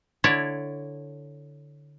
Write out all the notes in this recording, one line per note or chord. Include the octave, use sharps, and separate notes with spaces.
D3 E4 C#5 D5